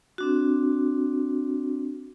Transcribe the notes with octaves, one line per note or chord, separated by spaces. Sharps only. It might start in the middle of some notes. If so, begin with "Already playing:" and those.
C4 D4 F#4